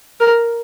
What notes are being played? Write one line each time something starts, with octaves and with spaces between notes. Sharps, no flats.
A#4